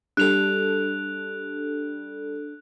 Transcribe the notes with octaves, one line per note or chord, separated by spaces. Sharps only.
G3 D4 A4 F#6 F7